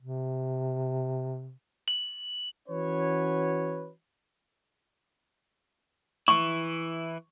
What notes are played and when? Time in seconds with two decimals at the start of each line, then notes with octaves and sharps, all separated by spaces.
0.02 C3
1.88 F#7
2.69 E3 C#4 F#4 B4 C#5
6.28 E3 E4 C#6